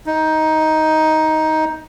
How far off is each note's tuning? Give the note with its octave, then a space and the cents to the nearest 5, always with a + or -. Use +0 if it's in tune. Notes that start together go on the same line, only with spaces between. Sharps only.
D#4 +10